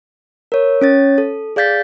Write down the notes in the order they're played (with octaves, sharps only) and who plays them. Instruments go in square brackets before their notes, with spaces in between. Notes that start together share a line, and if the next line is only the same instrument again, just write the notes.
[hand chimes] A#4 C#5
C#4 C#5 A6
A4
G#4 D5 F5 G6 A6 B6